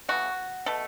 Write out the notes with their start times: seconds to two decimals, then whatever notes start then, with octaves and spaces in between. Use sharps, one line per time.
0.09 C#3 E3 A3 F#4
0.66 B2 A3 A4